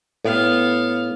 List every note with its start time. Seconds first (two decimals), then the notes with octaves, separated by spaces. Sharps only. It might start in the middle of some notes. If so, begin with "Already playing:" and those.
0.25 A2 B3 F5